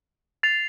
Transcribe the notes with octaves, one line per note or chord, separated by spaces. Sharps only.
A6 C7 F7